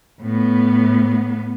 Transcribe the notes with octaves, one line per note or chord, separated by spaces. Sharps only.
A2 B3